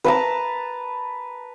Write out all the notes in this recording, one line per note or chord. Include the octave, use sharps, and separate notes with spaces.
B4 A5 A#5